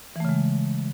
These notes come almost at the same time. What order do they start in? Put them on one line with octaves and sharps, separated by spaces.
E3 A3 C#3 G#3